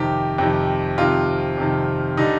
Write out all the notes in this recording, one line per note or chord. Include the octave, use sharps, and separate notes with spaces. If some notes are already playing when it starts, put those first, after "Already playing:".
Already playing: F2 C3 D#3 G4
F2 C3 D#3
F2 C3 D#3 F4
F2 C3 D#3
D3 G3 D#4